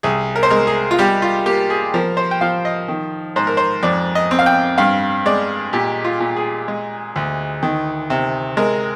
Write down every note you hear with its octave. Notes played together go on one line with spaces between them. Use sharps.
C2 G#4
A#4
C5
G#3 A#4
G#4
F4
G3 G4
F4
A#3 G4
G#4
F3 A#4
C5
G5
F3 F5
D#5
D#3
G#2 C5
A#4
C5
F2 D5
D#5
C4
F5
G5
G2 F5
G#3 D5
A#2 G4
F4
A#2
G#4
G#3
D2
D#3
C3
G#3 A#4